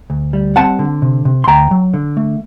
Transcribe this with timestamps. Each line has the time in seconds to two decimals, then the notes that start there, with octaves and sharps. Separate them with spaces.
0.10 D2
0.33 G3
0.56 C4 F#5 A5
0.79 D3
1.02 C3
1.25 C3
1.44 C6
1.48 D2 G5 A#5
1.71 F#3
1.94 D3
2.17 A3